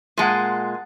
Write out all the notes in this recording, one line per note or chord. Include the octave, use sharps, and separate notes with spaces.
A#2 G#3 F#5 A5 C6